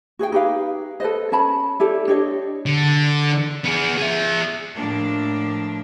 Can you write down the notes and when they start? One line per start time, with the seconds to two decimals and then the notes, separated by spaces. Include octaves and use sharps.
0.19 F#4 G#4 C5 G5
0.32 D#4 G4 B4 F5
1.00 A4 B4 C5 D#5
1.32 C#4 A#4 A5 B5
1.80 E4 G4 A4 D5
2.08 D4 G4 C#5 D#5
2.66 D3
3.64 B3 G#4
3.98 G#4 E5
4.74 A2 F3 A#3 D4